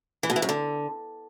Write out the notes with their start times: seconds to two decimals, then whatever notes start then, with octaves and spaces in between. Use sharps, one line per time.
0.23 E3
0.30 B2
0.36 E3
0.42 F#2
0.49 D3